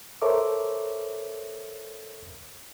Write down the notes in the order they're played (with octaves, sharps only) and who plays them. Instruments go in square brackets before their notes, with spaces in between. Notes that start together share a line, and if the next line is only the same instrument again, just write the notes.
[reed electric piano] A4 A#4 C5 C#5 E5 D6